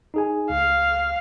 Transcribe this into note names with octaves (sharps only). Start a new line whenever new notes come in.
D#4 G#4 G#5
C#2 F5